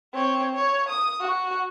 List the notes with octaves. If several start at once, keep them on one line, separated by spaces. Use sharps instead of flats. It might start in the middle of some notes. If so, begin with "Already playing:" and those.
C4 C#5
C#5
D#6
F#4